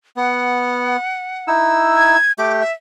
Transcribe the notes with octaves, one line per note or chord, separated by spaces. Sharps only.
B3 F#5
D#4 E4 E6
G#6
A3 G4 D6
E5